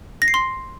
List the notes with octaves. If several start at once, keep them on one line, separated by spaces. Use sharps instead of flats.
A#6
C7
C6